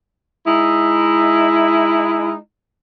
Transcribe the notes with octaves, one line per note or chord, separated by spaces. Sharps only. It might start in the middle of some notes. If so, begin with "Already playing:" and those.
G#3 D#4 E4